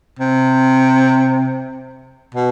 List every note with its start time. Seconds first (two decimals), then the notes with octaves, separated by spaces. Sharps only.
0.19 C3
2.34 B2